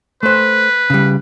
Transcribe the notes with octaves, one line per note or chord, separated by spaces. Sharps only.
A3 B4 C5
C#3 G3